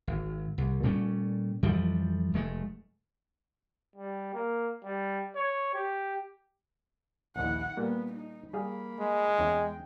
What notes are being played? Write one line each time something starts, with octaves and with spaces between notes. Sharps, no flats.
G#1
C2
A#2 G3 A3 C#4
F2 E3 F3 G3
F1 G#3 A3
G3
A#3
G3
C#5
G4
A#1 D#2 E4 F#5
A#2 G3 A#3 B3
D#4
G3 A#3 G#4 F5 B5
G#3
E2 C#4 C#5 G5